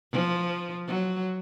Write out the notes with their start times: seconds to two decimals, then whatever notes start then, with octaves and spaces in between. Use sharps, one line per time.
0.12 F3
0.87 F#3